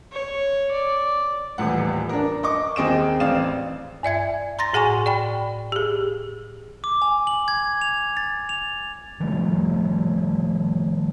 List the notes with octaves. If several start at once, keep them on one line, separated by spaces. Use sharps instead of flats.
C#5
D5
D#1 E2 A2 F#5
D4 A#4
D#5 C#6 D6
D#2 C4 G#4 D#5 D7 E7
A1 C4 D5 F5 E7
G2 D5 E5 G#6
A#5 C6 A6 A#6
A2 G#4 F#5 G#5 C#6
D5 G5 B5
G4 G#4
D6
G#5
F#7
G#6
F7
A6
F7
D#3 F3 G3 A3